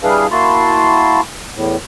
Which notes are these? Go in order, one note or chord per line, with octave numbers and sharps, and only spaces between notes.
G3 D4 E4 G#4 B4 F5
A#3 E4 F#4 A5 C6
E2 A2